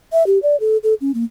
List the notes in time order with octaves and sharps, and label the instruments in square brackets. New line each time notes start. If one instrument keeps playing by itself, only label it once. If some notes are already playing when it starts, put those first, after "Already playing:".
[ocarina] E5
G4
D5
A4
A4
C#4
A#3